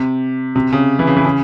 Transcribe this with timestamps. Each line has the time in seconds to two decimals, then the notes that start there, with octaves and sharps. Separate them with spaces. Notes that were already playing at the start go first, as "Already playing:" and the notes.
Already playing: C3
0.56 C3
0.72 C#3
0.99 E3
1.07 C#3
1.17 E3
1.24 C#3